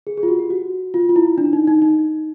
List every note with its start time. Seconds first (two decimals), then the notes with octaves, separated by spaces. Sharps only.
0.07 G#4
0.17 G#4
0.23 F4
0.28 F#4
0.39 G4
0.50 F#4
0.94 F4
1.09 F4
1.16 E4
1.38 D4
1.53 D#4
1.67 D#4
1.82 D#4